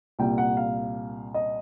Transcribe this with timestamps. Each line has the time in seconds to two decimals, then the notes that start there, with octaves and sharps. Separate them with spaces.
0.19 C2 A#2 G5
0.38 F#5
0.57 F5
1.34 D#5